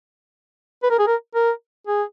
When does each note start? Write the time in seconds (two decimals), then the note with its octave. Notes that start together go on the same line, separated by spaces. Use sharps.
0.83 B4
0.90 A#4
0.99 G#4
1.07 A#4
1.35 A#4
1.87 G#4